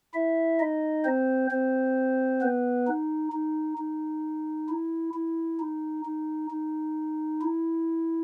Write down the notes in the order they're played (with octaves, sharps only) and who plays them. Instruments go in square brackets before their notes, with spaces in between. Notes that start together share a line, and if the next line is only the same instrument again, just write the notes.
[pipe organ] E4 E5
D#4 D#5
C4 C5
C4 C5
B3 B4
D#4
D#4
D#4
E4
E4
D#4
D#4
D#4
E4